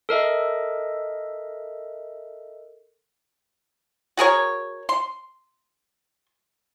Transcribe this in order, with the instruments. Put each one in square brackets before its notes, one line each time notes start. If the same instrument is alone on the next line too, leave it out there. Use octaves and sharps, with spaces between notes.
[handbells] A4 A#4 D#5 E5
[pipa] F#4 G#4 A#4 C#5
C6